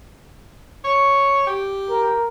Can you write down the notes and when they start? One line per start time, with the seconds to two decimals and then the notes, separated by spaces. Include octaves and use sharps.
0.84 C#5
1.47 G4
1.90 A#4